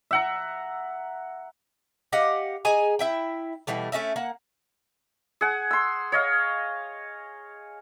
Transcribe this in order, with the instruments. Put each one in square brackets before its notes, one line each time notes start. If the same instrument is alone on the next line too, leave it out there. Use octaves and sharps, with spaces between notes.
[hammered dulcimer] E5 F#5 A#5
[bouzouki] G4 D#5 F5 F#5
G#4 D#5 G#5 A#5
E4 E5 G5
B2 E3 G3 A3
A3 C#4 D#5 E5
A#3 F#5
[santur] G#4 F#5
C6 E6
C#5 D#5 F5